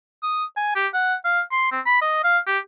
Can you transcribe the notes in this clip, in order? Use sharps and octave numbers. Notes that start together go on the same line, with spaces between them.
D#6
G#5
G4
F#5
F5
C6
C4
B5
D#5
F5
G4